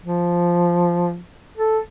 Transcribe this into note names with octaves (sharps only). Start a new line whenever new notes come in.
F3
A4